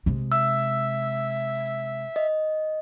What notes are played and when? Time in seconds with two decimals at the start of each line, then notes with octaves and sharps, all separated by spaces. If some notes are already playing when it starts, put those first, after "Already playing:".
0.06 C3 G#3
0.32 E5 E6
2.16 D#5